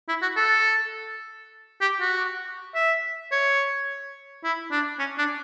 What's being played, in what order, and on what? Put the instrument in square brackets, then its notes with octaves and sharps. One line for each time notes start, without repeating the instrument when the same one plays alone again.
[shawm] E4
F#4
A4
G4
F#4
E5
C#5
E4
D4
C#4
D4